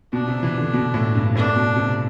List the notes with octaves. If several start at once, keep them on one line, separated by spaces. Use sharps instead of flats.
B2 D4
C3
E3
D3
B2
A2
G2
A2 D4
B2
C3